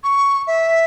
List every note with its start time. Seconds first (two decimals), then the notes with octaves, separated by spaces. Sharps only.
0.03 C#6
0.47 E5